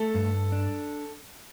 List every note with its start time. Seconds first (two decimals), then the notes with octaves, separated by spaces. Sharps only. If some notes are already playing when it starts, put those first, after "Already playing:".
Already playing: A3 A4
0.14 G2
0.52 D4